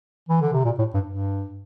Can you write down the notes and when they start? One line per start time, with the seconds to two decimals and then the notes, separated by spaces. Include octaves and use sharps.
0.29 E3
0.41 D3
0.53 C3
0.64 A#2
0.79 A2
0.94 G2
1.07 G2